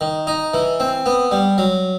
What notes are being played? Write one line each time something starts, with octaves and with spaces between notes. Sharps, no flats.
D#3
D#4
E3
C4
B3
G3
F#3